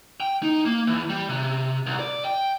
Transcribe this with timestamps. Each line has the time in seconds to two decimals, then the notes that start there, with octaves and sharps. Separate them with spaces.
0.20 G5
0.43 D#4
0.65 A#3
0.87 E2
1.10 G3
1.29 C3
1.86 C2
2.00 D5
2.25 G5